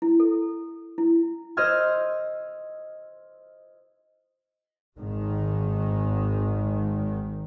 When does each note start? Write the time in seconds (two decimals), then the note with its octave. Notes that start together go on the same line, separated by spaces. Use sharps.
0.02 E4
0.20 A4
0.98 E4
1.57 C5 D#5 E6 F6 G#6
4.98 G#1 D#3